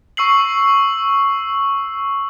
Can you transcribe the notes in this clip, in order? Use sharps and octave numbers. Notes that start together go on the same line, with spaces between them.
C#6 E6 C7 F#7